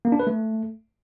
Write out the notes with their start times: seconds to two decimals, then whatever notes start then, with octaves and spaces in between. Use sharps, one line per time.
0.05 A#3
0.12 D4
0.19 B4
0.27 A3